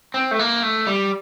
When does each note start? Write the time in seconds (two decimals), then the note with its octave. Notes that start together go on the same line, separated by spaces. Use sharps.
0.14 C4
0.31 A3
0.39 A#3
0.63 A3
0.87 G3